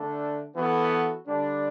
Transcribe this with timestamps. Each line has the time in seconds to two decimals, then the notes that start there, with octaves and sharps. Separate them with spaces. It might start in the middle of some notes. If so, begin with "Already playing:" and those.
Already playing: D3 A3 D4 A4
0.56 E3 B3 F#4 A4
1.26 D3 G3 D4